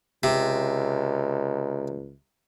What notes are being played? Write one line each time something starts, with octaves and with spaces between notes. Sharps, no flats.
C#2 C3